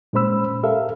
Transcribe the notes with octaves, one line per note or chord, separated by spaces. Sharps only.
A#2 G#3 C#4 C5 B5 E6
G4 A4 A#4 E5 F5